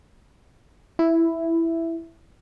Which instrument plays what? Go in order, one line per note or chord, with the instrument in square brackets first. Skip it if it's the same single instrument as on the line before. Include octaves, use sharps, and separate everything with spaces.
[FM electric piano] E4